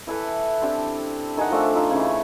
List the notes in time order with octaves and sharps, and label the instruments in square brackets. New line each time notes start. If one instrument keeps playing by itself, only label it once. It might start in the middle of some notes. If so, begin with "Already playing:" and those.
[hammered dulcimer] E3 E4 A4 B4
C4 D4 G4
D#3 G#4 D#5 F#5
F3 A3 D4 E5
D#4 F4 E5
C#3 E3